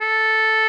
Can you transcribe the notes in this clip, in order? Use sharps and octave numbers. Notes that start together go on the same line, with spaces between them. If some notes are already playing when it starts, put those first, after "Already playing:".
A4